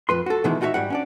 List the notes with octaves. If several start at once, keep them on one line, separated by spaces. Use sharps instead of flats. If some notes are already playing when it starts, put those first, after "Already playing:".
F2 B4 C6
F#4 A4
B2 D#3 E3 G#3 E4
D#4 F4 F#4 A4 C#5 E5
G#2 G3 F#5
C#4 D4 D5